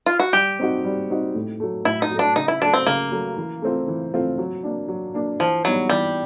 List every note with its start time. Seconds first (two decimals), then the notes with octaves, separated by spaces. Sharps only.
0.06 F4
0.19 F#4
0.33 G3 G4
0.59 C4 D#4 F#4
0.84 G3
1.10 C4 D#4 F#4
1.35 A2
1.60 F#3 A3
1.85 A2 E4
2.02 D#4
2.11 F#3 A3
2.19 D4
2.36 C#3 D#4
2.48 E4
2.61 F#3 A3 D4
2.73 C4
2.87 C#3 A#3
3.12 F#3 A3
3.37 E3
3.62 A3 C4 F4
3.88 E3
4.13 A3 C4 F4
4.38 F#3
4.63 A#3 D4
4.88 F#3
5.14 A#3 D4
5.40 E3 F3
5.65 F#3 G3 B3 D#4 F#4
5.90 E3 G3